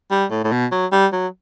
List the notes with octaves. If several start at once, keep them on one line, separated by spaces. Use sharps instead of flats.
G3
A2
A2
B2
F#3
G3
F#3